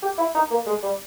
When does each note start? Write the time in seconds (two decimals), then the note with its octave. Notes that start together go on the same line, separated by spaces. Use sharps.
0.02 G4
0.18 E4
0.35 D#4
0.50 A#3
0.67 G#3
0.83 G3